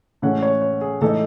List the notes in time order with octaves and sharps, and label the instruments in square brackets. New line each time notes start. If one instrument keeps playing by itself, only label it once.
[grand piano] A2 E3 G#3 C#4 F#5
C#5
C#5
G#4
A2 E3 G#3 D#4 A4